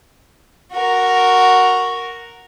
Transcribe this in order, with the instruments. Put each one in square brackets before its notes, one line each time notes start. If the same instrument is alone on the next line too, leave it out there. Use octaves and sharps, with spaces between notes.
[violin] F#4 A#4